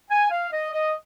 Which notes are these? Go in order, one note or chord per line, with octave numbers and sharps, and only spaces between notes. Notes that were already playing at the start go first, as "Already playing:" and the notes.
G#5
F5
D#5
D#5